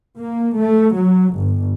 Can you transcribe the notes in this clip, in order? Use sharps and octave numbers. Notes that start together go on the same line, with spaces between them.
A#3
A3
F#3
G1